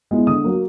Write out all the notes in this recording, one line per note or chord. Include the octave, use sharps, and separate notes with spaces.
G#3 B3 E4
D3 D#6
F#3 A#3